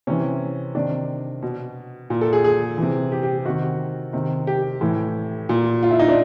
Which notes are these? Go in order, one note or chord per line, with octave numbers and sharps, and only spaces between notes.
C3 E3 C#4
C3 D#3 D4
B2
A#2
A4
G#4
G#4
C3 E3
G4
G4
C3 D#3 F#4
C3 D#3
G4
A2 E3
A#2
F4
E4
D#4
D4